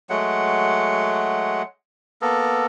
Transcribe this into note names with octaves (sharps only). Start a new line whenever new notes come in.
F#3 G#3 A3 F#5
A#3 B3 A4